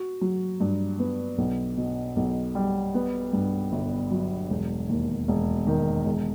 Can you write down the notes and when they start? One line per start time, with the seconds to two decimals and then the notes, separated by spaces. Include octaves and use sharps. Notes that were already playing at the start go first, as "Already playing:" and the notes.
Already playing: F#4
0.21 F#3
0.60 G2
0.99 B3
1.38 B1
1.77 B2
2.16 B1
2.55 G3
2.94 B3
3.33 G2
3.72 G1
4.11 F#3
4.50 E1
4.89 D#2
5.28 E1
5.67 D#3
6.06 E1